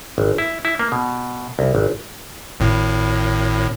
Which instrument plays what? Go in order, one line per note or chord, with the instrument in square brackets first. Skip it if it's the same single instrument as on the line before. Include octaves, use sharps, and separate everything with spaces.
[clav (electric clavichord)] G#1
E4
E4
A#3
B2
C2
G#1
[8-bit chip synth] G#1 A2